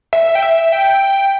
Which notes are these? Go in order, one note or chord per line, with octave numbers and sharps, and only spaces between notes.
E5
G5
E5
G5